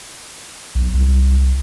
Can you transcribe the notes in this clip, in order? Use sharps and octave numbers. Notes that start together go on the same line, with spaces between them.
B1
C2